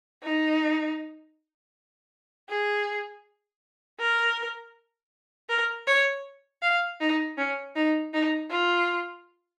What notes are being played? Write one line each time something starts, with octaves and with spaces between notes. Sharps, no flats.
D#4
G#4
A#4
A#4
C#5
F5
D#4
C#4
D#4
D#4
F4